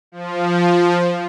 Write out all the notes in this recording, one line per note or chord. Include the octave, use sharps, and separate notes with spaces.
F3